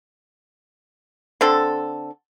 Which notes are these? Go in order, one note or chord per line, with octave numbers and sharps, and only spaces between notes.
D3 C4 A4